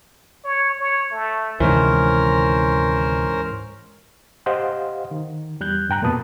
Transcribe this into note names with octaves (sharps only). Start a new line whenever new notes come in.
C#5
C#5
A3
D2 G#2 C3 D#3 E3 C#4 A#4 C5
G4 C5 D#5 F5 F#5
D#3
E2 G3 F#6 G6
G2 G5 A#5 F#6
F2 B2 A#3 B4 A5 D#6